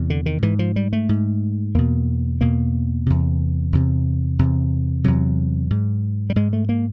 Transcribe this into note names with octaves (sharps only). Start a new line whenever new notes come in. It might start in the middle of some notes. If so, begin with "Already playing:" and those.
Already playing: E2 C3
D3
D#3
G#2 E3
F3
G3
A3
G#2
E2 B2 A#3
E2 B2 A#3
E2 C3
E2 C3
E2 C3
E2 C3 F#3
G#2
G3
G#2 G#3
A3
A#3